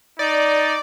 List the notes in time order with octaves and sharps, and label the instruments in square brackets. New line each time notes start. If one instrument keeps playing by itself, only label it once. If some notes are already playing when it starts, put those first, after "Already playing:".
[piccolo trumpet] D#4 [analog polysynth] D5